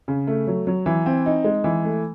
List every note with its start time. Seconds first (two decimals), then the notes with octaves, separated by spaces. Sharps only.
0.08 C#3
0.27 A3
0.47 F#3
0.67 F#3
0.86 E3
1.06 C4
1.26 D#4
1.44 G#3
1.64 E3
1.85 A3